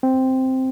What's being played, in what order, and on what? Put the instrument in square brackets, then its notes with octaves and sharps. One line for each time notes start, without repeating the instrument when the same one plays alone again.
[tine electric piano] C4